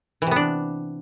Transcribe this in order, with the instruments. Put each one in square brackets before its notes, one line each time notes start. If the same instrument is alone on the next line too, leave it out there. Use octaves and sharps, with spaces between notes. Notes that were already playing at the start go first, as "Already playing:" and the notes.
[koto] E3
C3
B3
D4